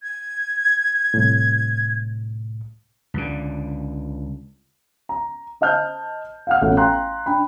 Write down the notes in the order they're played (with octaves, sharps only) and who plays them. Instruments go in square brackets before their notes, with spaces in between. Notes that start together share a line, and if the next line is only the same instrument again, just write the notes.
[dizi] G#6
[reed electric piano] C2 A2
[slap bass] C#2 D3
[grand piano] A#5
C5 D#5 A5 F6 G6
F5 F#5 F6
A1 B2 A3 F4 F#5
F5 G5 A#5 C6 F#6
D4 G5 B5